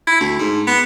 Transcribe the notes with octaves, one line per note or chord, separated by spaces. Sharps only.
E4
D2
G#2
B3